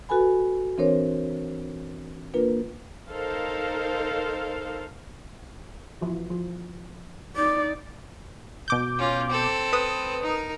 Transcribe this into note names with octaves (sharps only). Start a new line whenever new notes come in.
F#4 A4 B4 G#5 B5
E3 C4 D4 A#4 C5 C#5
A#3 D4 F4 A#4 B4
D#4 A4 A#4 C5 F5
E3 F3 F#4
F3
D#4 D5 D6
B2 D6 G6
C#4 F4
C4 A4
B4 D#6
D#4 A#4